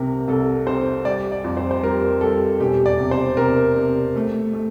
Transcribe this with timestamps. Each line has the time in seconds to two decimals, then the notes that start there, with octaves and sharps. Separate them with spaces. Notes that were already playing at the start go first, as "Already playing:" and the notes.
Already playing: C2 C3 A#4
0.28 C2 A4
0.67 C3 C5
1.05 G3 D5
1.32 D5
1.44 F2
1.57 C5
1.71 C5
1.83 G3 A#4
2.21 G3 A4
2.60 E1 G4
2.86 D5
2.98 C3
3.11 C5
3.37 C3 A#4
3.76 C3
4.16 A3
4.53 A3